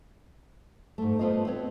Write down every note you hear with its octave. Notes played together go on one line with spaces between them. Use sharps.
G#2 A3
G3 A3 B3 F4 C5 D#5
C4 B4 C#5